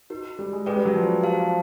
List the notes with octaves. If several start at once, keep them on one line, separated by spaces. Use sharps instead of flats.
D#4 F#4 A#4
G3
G#3
G#3 G#4 B4 D5 G5
G3
F#3
F3
G4 C5 F5 A5